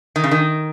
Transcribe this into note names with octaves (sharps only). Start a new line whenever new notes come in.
D#3
C#3
D#3